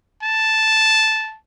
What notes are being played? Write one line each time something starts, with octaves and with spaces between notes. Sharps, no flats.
A5